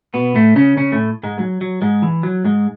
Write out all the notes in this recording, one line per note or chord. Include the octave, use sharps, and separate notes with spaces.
B2 B3
A2 A3
C#3 C#4
C#3 C#4
A2 A3
G#2 G#3
F#3
F#3
G#2 G#3
E3
F#3
G#2 G#3